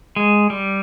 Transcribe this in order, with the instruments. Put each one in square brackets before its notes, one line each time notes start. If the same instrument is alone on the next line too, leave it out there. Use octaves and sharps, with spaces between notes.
[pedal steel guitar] G#3
G3